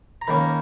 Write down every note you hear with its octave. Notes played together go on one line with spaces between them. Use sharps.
A#5
D#3 A#3 C#4 B5